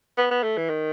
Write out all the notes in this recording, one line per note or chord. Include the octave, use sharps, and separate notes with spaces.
B3
B3
A3
E3
D#3